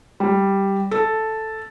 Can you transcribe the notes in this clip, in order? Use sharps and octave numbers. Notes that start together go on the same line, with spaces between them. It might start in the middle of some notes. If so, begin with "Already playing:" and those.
G3
A4